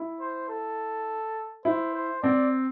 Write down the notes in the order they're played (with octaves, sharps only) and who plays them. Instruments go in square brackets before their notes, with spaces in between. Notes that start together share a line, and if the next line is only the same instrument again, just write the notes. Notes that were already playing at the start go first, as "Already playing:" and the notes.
Already playing: [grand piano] E4
[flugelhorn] C5
A4
[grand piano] E4 [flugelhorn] C5
[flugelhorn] C5
[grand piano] C4 [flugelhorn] D5